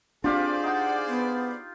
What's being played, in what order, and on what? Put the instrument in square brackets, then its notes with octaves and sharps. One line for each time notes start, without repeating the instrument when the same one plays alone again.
[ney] C4 [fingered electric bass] D4 [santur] F4 G4 F5 [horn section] G#4 C5 D5
[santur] D#4 [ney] F#5
[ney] B3